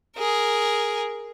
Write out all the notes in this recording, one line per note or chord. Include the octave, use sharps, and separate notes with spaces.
G#4 A#4